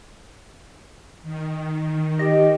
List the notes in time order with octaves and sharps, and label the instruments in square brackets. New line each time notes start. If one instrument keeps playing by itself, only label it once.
[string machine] D#3
[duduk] G4 [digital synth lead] D#5